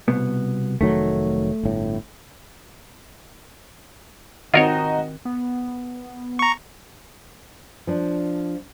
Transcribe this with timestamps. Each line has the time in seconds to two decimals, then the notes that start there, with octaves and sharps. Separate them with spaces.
0.08 C2 B2 B3
0.81 F1 D#3 F#3 A3
1.63 G1 A2
4.54 D#3 C4 D#4 F4 F#4 A#4 C#5 D#5
5.25 B3
6.39 A#5 C#6
7.87 F3 D4